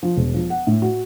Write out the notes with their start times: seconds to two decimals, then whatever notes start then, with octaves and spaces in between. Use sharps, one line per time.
0.03 F3
0.16 E1
0.34 F3
0.50 F#5
0.67 A2
0.82 F#4